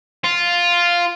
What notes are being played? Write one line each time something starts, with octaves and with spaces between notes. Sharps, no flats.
F4